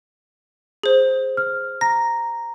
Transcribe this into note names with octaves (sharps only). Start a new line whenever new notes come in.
G#4 C5
F6
A#5 A#6